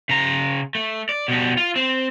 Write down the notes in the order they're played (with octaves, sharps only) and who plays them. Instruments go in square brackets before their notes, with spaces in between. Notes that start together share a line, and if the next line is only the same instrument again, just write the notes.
[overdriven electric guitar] C#3 A#5
A3
D5
B2 G3
F4
C4